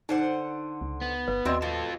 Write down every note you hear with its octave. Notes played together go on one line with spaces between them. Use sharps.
D3 D#4 C5 F#5
C#2
B3
G1 B4
D#2 C4 D4 F#4 D#5 E5
A2 F4 A4